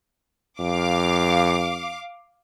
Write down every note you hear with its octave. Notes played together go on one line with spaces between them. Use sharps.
F2 F5 D6